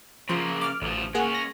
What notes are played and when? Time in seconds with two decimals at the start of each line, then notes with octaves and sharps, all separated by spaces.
0.29 C#3 F3 A#3 C6
0.61 D6 F6
0.82 A1 D2 F3
1.15 G#3 A#3 C#4 G#4 F#5
1.34 A#6